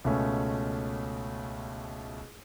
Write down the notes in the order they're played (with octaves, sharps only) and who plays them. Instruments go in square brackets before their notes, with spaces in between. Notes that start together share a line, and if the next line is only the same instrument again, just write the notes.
[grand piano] C#2 B2 A3 C#4